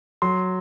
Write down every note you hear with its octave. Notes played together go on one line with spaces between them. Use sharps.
F#3 C6